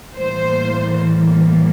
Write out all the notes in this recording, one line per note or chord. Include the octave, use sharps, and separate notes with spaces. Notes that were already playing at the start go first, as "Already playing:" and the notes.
A2 E3 G3 A#3 C5